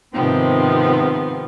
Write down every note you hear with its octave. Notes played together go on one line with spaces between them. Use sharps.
G#2 C3 D#3 F3 B3 C4